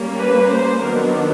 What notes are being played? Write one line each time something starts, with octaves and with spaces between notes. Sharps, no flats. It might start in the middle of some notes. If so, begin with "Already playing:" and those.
Already playing: G3 A#3 C#4
B4
C5
D#3 F#3 B3 D4 A#4